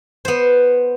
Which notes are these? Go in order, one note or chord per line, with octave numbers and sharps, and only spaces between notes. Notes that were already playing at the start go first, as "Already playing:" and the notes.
B3 C5